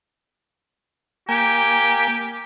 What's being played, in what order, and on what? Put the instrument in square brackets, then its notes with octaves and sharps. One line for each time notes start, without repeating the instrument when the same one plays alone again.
[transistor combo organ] A#3 G5 G#5 [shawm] G4